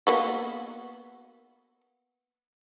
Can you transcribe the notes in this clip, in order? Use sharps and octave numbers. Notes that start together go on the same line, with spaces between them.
A#3 B3 F#4